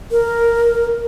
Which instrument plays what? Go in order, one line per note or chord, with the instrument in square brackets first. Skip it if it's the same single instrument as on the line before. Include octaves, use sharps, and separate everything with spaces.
[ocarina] A#4